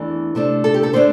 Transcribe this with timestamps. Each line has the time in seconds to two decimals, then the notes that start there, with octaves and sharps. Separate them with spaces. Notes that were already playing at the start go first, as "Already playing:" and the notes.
Already playing: E2 E3 A3 D4
0.35 C3 A3 D4
0.64 A4
0.74 G4
0.83 A4
0.93 D3 A3 D4 C5